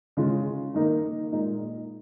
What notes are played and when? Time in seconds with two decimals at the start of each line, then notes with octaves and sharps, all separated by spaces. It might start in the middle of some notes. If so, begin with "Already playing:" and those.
0.17 C#3 G#3 C#4 F4
0.74 D#3 A#3 D#4
1.32 A#2 G#3 D#4